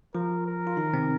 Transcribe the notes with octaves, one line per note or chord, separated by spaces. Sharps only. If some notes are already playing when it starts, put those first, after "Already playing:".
F3 F4 A#4
A#4
F4
D#3 D#4
C3 C4